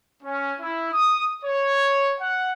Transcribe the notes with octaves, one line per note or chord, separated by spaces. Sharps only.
C#4
E4
D#6
C#5
F#5